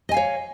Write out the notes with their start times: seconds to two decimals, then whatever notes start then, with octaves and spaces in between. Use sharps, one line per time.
0.09 D#5
0.11 G#5
0.14 F5
0.17 C#5